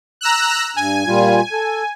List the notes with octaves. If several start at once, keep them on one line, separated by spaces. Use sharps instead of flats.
A#5 E6 F#6
G2 G#5
A#2 G3 F4
A4